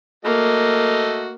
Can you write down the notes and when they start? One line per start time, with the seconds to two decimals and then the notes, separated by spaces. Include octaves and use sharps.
0.25 A3 A#3 F#4 D#5